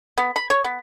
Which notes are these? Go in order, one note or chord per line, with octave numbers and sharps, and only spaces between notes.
B3
B5
C#5
B3